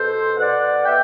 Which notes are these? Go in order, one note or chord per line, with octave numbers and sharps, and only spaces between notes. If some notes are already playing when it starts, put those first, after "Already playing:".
Already playing: B2 A4 C5
B2 D5 F#5
B2 E5 G5